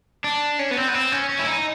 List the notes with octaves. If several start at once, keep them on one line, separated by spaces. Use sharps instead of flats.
D4
C#4
B3
C4
B3
C4
C#4
C#4
E4
D#4